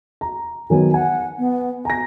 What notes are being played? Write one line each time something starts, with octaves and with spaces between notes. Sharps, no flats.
A#5
D#3 F#3 B3 G#5
F#5 G#5
B3
G#5 A#5 A#6